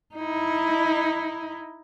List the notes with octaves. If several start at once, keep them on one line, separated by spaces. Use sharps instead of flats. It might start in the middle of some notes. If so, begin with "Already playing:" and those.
D#4 E4